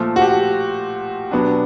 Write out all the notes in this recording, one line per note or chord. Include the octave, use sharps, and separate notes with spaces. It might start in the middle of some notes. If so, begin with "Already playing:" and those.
Already playing: A#2 F3 A3
F#4
G4
B2 F#3 B3 D4